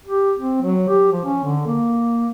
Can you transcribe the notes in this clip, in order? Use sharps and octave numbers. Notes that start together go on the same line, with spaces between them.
G4
C4
F#3
G4
F3
C#4
D3
A#3